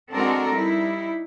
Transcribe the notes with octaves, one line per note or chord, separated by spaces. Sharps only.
G#3 C4 D4 F#4 A4 A#4
G3 D#4 E4